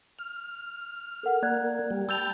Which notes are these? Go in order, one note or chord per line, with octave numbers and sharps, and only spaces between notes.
F6
A4 A#4 F#5
A#3 D5 F#6 G#6
G3
G5 A5 B5 E6 G6 F7